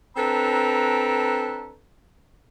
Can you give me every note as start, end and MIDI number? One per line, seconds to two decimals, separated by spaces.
0.17 1.78 60
0.17 1.78 62
0.17 1.78 69
0.17 1.78 71
0.17 1.78 82